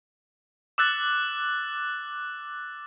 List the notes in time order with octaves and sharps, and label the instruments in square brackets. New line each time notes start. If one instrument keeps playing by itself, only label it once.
[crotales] D6 E6 F#6 A6